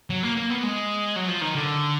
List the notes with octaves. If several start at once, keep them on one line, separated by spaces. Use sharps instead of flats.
F#3
A#3
A#3
B3
G#3
F#3
F3
D#3
D3